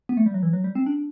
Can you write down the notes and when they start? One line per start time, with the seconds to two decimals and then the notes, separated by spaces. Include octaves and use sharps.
0.09 B3
0.17 A3
0.26 G3
0.34 F#3
0.43 E3
0.53 F#3
0.64 G3
0.75 C4
0.86 D4